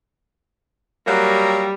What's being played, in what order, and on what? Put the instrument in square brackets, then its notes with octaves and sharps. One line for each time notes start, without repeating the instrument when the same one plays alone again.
[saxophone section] F#3 A#3 [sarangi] G3